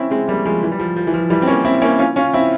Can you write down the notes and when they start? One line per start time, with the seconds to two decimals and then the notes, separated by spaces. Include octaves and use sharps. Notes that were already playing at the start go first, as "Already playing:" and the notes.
Already playing: C4 C#4 E4
0.11 G#3 C4
0.27 G3 A#3
0.45 F3 G#3
0.63 E3
0.72 G3
0.80 F3
0.96 F3
1.07 E3
1.14 F3
1.30 E3 G3
1.42 C4
1.47 A#3 C#4
1.65 C4 E4
1.82 A#3 C#4
1.99 C#4 F4
2.16 C#4 F4
2.33 C4 E4